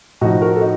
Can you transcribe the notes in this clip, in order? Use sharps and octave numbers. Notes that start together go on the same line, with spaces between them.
A2 F3 D#4 F#4
F#4 A#4
A4
D#4 F#4